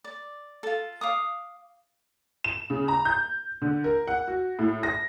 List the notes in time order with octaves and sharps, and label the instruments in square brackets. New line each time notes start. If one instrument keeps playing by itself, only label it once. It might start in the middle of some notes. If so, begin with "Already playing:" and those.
[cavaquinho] D5
F4 A4
F5 D6 D#6
[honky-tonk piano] E7
C#3
A#5
G6
D3
A#4
F#5
F#4
A2
A#6